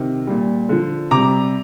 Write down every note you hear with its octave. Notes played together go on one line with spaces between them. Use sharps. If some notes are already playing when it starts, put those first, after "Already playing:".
Already playing: C3 D#3
A#2 G3
D3 F3
C3 G3 A#5 D6